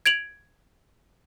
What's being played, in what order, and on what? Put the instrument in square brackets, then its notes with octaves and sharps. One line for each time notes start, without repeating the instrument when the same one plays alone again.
[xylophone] G#6 D7 F7 F#7